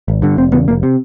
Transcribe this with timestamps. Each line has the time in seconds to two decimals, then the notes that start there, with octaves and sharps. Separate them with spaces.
0.08 G#1
0.22 G2 D3
0.38 F1 C4
0.53 E2 C#3 B3
0.68 F1 A#3
0.83 C3